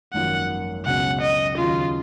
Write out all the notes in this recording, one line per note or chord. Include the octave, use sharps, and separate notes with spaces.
G#1 F#2 F3 A#3 F4 F#5
C#2 B2 F#3 C#4 F#5
D#5
D#2 C#3 F#3 F4